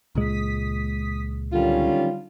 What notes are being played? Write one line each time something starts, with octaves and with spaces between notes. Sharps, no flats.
C#2 A#2 G#3 D#6 B6
D3 D#3 F#3 G3 C#4 F4